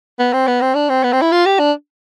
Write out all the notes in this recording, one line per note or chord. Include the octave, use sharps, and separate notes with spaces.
B3
C4
B3
C4
D4
C4
B3
C4
E4
F4
G4
D4